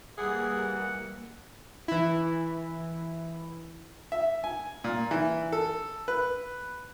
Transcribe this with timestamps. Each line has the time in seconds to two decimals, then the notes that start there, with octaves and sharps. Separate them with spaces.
0.18 E3 G3 A#3 G#4 F#5
1.88 E3 E4
4.12 E5
4.44 G#5
4.84 A#2
5.11 E3
5.52 A4
6.08 B4